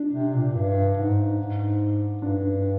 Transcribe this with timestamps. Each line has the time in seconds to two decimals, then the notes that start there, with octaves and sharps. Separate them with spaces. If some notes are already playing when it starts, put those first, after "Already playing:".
Already playing: D4
0.13 C3
0.34 A#2
0.55 G2
0.97 G#2
1.38 G#2
2.21 G2 D4